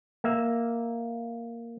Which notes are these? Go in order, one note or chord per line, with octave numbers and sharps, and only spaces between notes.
A#3 E5